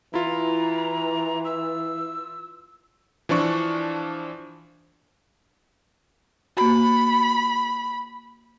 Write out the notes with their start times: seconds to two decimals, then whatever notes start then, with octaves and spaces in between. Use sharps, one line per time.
0.14 E3 E4 F4 A#5
1.45 E6
3.29 E3 F3 D4 C#6
6.57 A#3 F#4 B5